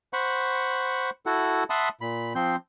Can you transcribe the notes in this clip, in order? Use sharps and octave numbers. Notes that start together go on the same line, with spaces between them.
C5 F#5 B5 C#6
E4 F#4 A4 F#5
E5 F#5 A5 B5 C6 D#6
A#2 B5
F3 C4 C6 G6